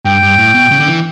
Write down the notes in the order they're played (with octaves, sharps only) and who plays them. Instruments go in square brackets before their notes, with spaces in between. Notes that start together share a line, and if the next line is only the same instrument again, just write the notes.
[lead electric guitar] G2 [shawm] G5
[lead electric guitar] G2
A2
B2
C#3
D3
E3